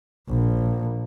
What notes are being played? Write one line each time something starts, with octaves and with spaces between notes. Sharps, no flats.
A#1